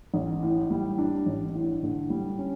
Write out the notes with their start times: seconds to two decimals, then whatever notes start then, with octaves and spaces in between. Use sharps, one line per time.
0.14 A1
0.43 A2
0.70 G3
0.98 D4
1.26 A1
1.54 A2
1.83 D3
2.10 G3
2.39 C#4